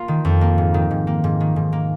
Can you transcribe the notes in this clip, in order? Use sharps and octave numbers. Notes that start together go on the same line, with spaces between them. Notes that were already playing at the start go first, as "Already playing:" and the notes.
Already playing: A#3 F4
D#3
F2
A#3
G#2
D#3
G#2
A#3
G#2
D#3
G#2
A#3